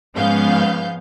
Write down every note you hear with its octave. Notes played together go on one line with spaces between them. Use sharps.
G#2 F3 B3 C#4 F5 G6